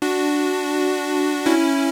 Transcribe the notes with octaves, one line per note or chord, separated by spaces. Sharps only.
D4 F#4
C#4 E4